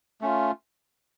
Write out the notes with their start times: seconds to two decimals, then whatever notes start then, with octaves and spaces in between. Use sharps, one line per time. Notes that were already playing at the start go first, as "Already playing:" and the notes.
0.21 A3 C#4 F4